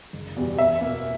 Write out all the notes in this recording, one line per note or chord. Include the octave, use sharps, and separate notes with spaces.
F#1
E2 B2 G3
E2 E5
B2 A#3